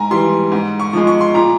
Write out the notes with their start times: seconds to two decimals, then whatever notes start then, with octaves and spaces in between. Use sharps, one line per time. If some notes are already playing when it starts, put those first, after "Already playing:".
Already playing: G#2 G#5 A#5
0.11 E3 G3 C6
0.52 G#2
0.80 C#6
0.93 F3 G#3
1.07 C#6
1.21 C6
1.34 A#2 A#5